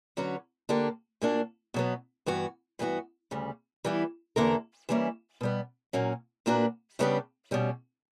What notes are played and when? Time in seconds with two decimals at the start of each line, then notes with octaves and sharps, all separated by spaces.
0.17 D3 F#3 C#4 F#4 B4
0.69 D3 A#3 D4 G4
1.22 A#2 A#3 D4 F#4
1.74 B2 F#3 B3
2.26 G2 E3 B3 F#4
2.79 G2 E3 B3 F#4
3.31 D2 C#3 G3
3.84 E3 G3 B3 E4
4.36 E2 D3 A#3 E4 A#4
4.89 E3 G3 A#3 C#4 E4
5.41 B2 G3 B3
5.93 A#2 F#3 A#3 C#4 F#4
6.46 A#2 A#3 D4 F#4 B4
6.99 C#3 G3 B3 D4 G4
7.51 B2 G3 C#4